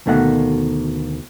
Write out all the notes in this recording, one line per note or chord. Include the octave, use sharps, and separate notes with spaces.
D2 B2 D#3 A3 A#3 F#5